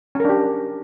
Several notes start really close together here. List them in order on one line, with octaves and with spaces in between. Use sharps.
C#4 A#4 D4 G4